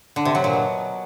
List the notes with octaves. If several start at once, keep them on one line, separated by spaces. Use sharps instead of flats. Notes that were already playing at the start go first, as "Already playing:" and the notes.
D3
C3
F#3
A#2
B2